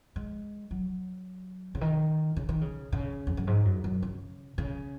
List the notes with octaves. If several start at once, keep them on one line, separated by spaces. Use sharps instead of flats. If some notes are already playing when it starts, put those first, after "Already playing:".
G#3
F#3
C#3
D#3
C#3
D#3
C#3
C#3
F2
F#2
G#2
F#2
F#2
C#3
C#3